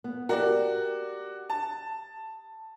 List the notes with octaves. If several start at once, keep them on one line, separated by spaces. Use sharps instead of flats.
B3
F#4 G4 A#4 D5
A5